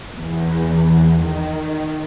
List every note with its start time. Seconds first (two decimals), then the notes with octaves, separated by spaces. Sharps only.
0.16 E2
1.22 D#3